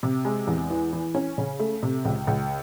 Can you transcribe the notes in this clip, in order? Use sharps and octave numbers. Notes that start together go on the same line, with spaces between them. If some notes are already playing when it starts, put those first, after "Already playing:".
C3
G#3
E2
E3
E3
C#4
C#3
A3
C3
C#2
C#2